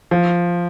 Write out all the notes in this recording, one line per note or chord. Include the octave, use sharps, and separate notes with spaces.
F3